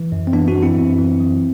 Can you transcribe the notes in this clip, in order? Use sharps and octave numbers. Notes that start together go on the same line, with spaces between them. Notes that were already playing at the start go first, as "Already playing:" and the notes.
Already playing: E3
F#2
C4
E3 B3 D4
D4 F#4
E3
C4 E4
F#2
E3
F#3